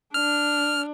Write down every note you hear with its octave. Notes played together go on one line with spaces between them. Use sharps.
D4 F6